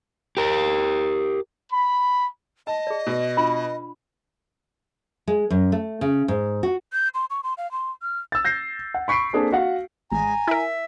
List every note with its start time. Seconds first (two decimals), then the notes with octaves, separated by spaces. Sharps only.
0.37 G4 A#4
1.72 B5
2.67 D#5 A5
2.87 G#4 D5
3.06 B2
3.37 D4 F4 B5
5.28 G#3
5.50 F#2
5.72 A3
6.01 C#3
6.28 G#2
6.63 F#4
6.93 G6
7.14 C6
7.30 C#6
7.43 C6
7.58 F5
7.72 C6
8.02 F6
8.32 E6 A6
8.45 G6 A#6 C7
8.94 F#5
9.08 B5 C#6 B6 C7 D7
9.33 A#3 C4 D4 G#4 A4
9.52 F#4 F5 F#5
10.11 A1 G#3 G#5 A#5
10.48 E4 A#4 E5